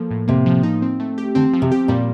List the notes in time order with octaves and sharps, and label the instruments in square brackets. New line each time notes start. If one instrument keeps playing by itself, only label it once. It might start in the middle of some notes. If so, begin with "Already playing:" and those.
Already playing: [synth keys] F3 A#3 A4
A2
[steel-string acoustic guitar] C3 [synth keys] A#3
[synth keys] F3
D#4
C4
A3
G4
[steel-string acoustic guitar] D3 [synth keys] C4
[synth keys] F3
[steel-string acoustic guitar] C3
[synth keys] G4
[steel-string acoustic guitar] A#2 [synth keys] G3